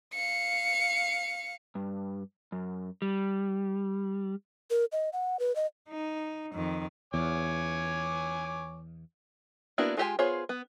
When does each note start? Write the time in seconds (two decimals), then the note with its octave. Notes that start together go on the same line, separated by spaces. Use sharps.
0.13 F5 C#7
1.75 G2
2.52 F#2
3.02 G3
4.70 A#4
4.92 D#5
5.13 F#5
5.39 B4
5.56 D#5
5.89 D#4
6.53 F2 D#3
7.14 E2 C#5 G#5 D6
9.78 A#3 B3 D4 E4 F#4
9.97 G#3 F4 G4 C5 G#5
10.19 B3 F4 G#4 C5 C#5
10.49 B3